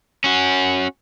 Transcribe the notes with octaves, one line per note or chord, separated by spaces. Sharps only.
C#4 F#4